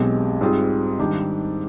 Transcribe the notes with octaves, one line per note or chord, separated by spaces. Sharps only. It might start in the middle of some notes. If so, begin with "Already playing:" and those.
Already playing: B1 B2 G#3 C4 G4
G#2 G3 C4 F4 G#4
G#2 D#3 G3 D4 G4